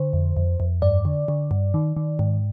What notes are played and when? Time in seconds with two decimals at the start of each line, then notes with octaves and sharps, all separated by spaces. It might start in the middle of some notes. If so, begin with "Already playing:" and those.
Already playing: D3 C5
0.13 F2
0.37 F2
0.60 F2
0.82 G2 D5
1.05 D3
1.28 D3
1.51 G2
1.74 D#3
1.97 D#3
2.19 G#2